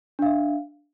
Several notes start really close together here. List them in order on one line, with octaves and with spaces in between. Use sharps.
D4 F5 E5